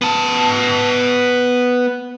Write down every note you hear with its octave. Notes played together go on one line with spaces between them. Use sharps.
B3 A5